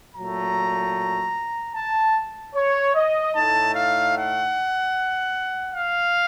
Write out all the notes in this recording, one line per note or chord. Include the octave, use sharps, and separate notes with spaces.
A#2 F#3 A3 A#5
A5
C#5
D#5
A2 A3 D#4 A5
F5
F#5
F5